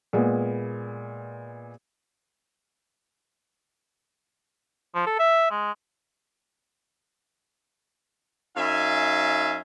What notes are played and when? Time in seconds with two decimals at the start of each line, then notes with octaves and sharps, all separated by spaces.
0.13 A#2 G#3 B3
4.95 F3
5.06 A4
5.19 E5
5.51 G#3
8.57 F#2 D#4 E5 F5 G#5